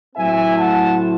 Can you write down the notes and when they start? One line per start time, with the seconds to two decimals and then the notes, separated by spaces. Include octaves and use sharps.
0.15 A2 F#3 A3 C4 E4 E5 G#5
0.57 F#5 A5